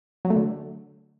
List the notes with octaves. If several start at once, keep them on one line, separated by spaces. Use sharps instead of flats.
F#3
A3
D3